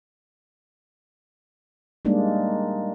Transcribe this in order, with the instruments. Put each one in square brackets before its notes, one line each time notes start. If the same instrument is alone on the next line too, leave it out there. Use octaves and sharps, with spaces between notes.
[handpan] G3 G#3 A#3 D4 D#4